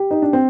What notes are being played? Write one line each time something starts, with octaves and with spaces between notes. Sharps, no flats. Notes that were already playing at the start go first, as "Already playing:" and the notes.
Already playing: G4
D#4
D4
C4